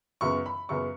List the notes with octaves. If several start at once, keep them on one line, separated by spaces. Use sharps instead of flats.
F#2 C#3 B3 C#6
B5
F#2 C#3 B3 C#6